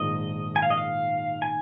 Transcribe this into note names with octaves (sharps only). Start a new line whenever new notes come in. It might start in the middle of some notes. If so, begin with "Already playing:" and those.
Already playing: A#1 G#2 D#3 D#5
G#5
F5
D#5
F5
G#5